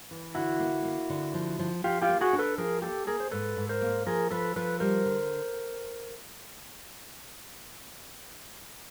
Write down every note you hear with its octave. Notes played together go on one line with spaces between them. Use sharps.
E3
D3 E4 F#4
A#3
A#3
D3
F3
F3
F3 F4 G4
F4 G4
A#3
F#4 G#4
D4
A4 B4
F3 G#4 A#4
A#3 G4 A4
A#3 G#4 A#4
C5
G#2 A4 B4
G#2
A#4 C5
A#3
F3 G#4 A#4
F3 A4 B4
F3 A4 B4
G3 A#4 C5
D3